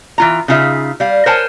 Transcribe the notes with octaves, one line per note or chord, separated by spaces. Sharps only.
E3 F4 A#5
C#3 D#4 F4 G#4 E5
G3 F5
A#4 C5 C#5 F#5 G#5 A5